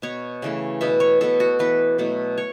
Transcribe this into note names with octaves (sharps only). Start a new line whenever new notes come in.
B2 B3 C#5
C#3 E3 A3
B2 B3 E5
C#5
B2 B3 A4
F#4
E3 B3 B4
B2 F#3 A3
C#5